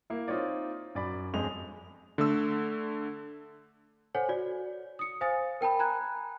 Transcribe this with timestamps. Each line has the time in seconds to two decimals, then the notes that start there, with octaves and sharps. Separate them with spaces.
0.10 A#3 E4
0.28 C4 D#4 F4 C#5 D5
0.95 F#2 D5 B5
1.33 G1 F2 G#3 G#4 D#5 F7
2.18 D3 A3 E6
4.15 A4 C5 C#5 F#5 G#5
4.29 F#4 C#5 D5
4.99 D#6 C#7
5.21 C5 F5 G#5 D#6 A6
5.61 A#4 G5 A5 B5
5.79 G#5 A#5 B5 F#6 G#6